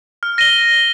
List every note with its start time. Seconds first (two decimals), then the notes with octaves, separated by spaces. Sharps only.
0.23 F6
0.38 A#6 D#7 G7